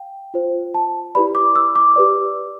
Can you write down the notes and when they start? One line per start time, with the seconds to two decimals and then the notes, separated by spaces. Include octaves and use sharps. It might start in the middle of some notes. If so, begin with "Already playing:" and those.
Already playing: F5 G5
0.34 F4 C5
0.74 A5
1.15 E4 G4 B4 D5 B5
1.35 D6
1.56 E6
1.76 D6
1.96 G4 B4 D5